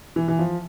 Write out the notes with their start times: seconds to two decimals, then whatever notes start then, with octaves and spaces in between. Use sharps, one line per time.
0.16 E3
0.28 E3
0.39 F3